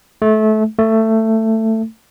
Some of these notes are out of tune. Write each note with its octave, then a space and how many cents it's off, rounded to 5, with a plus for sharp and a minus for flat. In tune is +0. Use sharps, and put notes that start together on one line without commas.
A3 -25
A3 +15